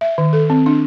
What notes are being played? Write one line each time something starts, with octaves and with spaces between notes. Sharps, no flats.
E5
D#3
A4
C4
D4